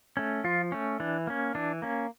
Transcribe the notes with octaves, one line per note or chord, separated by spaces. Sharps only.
A3 C#4
F3 F4
A3 C#4
E3 D4
A#3 C#4
E3 D4
A#3 C#4